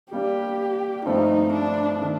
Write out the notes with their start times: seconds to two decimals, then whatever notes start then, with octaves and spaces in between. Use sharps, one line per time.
0.11 G3 A#3 D4 G4
1.06 G2 F3 A3 C4 D#4 F4
1.53 D4
2.01 D#3 A3